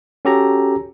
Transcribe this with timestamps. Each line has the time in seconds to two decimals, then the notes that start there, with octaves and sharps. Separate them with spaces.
0.25 C#4 F#4 G4 A4 A#5